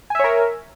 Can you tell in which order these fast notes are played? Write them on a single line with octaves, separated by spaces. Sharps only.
G#5 E5 C#5 A#4